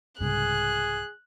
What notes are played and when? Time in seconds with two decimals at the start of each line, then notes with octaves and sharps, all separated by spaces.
0.20 C2 G#2 C#3 G#4 F#6